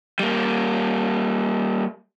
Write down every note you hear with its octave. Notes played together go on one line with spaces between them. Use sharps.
G3 A#3